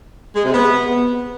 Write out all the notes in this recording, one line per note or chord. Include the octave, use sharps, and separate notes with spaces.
G#3
C3
B3